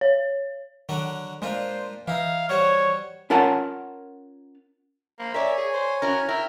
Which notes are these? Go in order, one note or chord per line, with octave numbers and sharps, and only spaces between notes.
C#5
D3 D#3 F#3 D4
A#2 G#3 D4 F4 C5
E3 D#4 E4 F5
G3 F#4 C5 C#5
C#4 F4 A#4 C#5 F#5 A5
A#3 C5 B5
A#4 C#5 D5 E5 G#5
G#4
C5
C#4 E4 F#4 A#4
E4 A#4 E5 G5